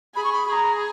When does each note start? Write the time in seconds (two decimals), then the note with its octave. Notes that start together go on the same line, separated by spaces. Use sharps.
0.15 G#4 B5
0.24 C#6
0.33 B5
0.48 G#4 B5
0.52 A#5